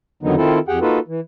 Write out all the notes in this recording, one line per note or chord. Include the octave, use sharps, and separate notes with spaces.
F2 D3 D#3 F#3 B3 D#4
D#3 C4 E4 F4 A4
F2 G4 G#4 F#5 G5
A#3 D#4 F4 F#4 A4 B4
E3